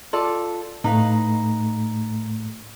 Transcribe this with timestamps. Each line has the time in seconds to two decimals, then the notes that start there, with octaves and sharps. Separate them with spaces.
0.13 F4 A4 D5
0.84 A2 A3 D#4 B4 F5